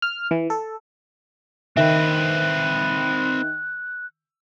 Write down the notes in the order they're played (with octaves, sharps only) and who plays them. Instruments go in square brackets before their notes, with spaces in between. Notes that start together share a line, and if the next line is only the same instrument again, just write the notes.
[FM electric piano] F6
E3
A4
[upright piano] D#3 E5 [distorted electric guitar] C4 B4 [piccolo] F#6